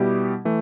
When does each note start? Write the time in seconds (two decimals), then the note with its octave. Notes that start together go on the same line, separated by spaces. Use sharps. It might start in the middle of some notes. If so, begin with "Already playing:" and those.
Already playing: B2 G3 B3 E4 G4
0.45 E3 A3